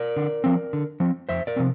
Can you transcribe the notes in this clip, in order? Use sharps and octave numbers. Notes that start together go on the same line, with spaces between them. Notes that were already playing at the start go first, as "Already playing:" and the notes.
Already playing: A#4 D5
D3
F3 C4
D3
F3 C4
F2 C5 E5
A#4 D5
C3 F3 C4